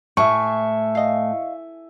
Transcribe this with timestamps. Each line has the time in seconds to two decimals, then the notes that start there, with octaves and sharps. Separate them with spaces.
0.17 A2 E5 G#5 C#6
0.95 D#5 F5